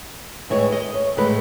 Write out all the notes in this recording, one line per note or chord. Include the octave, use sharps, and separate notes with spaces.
A2 E3 G#3 C#5
D#5
C#5
A2 E3 G#3 B4